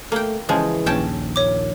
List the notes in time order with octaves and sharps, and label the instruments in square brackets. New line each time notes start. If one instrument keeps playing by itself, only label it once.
[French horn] A3 [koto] A#3 G5
[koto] C#3 F3 G#3 [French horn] E3
[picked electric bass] A#1 D#2 [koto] C#4 G5 A5
[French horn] A#2 [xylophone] C#5 D6